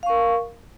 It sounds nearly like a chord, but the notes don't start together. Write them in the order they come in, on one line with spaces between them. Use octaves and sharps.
F5 C#6 A#4